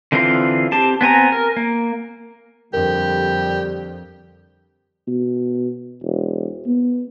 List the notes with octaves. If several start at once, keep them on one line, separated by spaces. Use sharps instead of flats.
D3 E3 C4 F4 F5
C4 G4 A5
B3 C4 G#5 A#5
A#4
A#3
F2 D3 G3 G4 A#4
B2
E1
B3